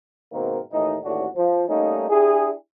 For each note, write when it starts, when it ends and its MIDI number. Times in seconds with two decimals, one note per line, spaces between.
0.33 0.58 44
0.33 0.58 47
0.33 0.58 51
0.33 0.58 58
0.33 0.58 60
0.33 0.58 70
0.72 0.97 39
0.72 0.97 45
0.72 0.97 52
0.72 0.97 63
1.04 1.25 33
1.04 1.25 39
1.04 1.25 45
1.04 1.25 62
1.04 1.25 66
1.36 1.64 53
1.68 2.08 55
1.68 2.08 57
1.68 2.08 58
1.68 2.08 61
1.68 2.08 63
2.09 2.50 62
2.09 2.50 64
2.09 2.50 67
2.09 2.50 68